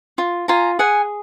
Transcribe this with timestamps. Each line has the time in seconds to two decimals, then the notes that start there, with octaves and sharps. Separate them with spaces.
0.18 F4
0.48 F4 G#5 A#5
0.79 G#4 F#5 G#5